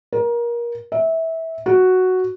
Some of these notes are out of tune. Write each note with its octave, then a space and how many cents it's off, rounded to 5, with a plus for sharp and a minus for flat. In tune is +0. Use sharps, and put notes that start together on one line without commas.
A#4 +25
E5 -20
F#4 +0